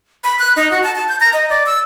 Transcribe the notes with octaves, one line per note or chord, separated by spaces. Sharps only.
B5
F#6
D#4
F#4
A5
A5
G6
A#5
D#5
D5
E6